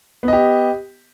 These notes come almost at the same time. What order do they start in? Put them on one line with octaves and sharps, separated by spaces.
B3 D#5 G4